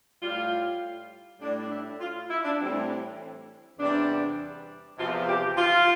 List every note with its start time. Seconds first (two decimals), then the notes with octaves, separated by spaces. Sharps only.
0.21 A2 G3 F4
1.40 A2 G3 D4
1.62 D4
1.70 E4
2.00 F4
2.30 E4
2.44 D4
2.59 A2 E3 G3 C4
3.79 E2 C3 G3 D4
4.97 E2 C3 F3 F4
5.28 G4
5.58 F4